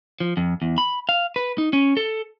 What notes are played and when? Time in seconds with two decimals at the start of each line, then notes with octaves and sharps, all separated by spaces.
0.20 F3
0.37 F2
0.62 E2
0.78 B5
1.09 F5
1.36 B4
1.58 D#4
1.73 C#4
1.97 A4